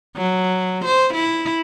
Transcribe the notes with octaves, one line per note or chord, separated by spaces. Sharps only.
F#3
C5
E4